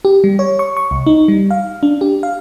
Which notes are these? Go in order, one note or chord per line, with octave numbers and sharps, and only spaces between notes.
G4
G3
C#5
C#6
C#6
C2
D#4
G3
F5
D4
G4
F5